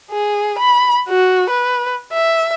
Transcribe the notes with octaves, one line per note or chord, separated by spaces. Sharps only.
G#4
B5
F#4
B4
E5